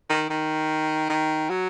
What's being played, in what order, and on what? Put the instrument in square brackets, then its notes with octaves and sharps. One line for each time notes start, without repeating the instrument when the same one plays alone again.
[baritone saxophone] D#3
D#3
D#3
F#3